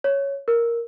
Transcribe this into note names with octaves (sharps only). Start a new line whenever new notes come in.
C#5
A#4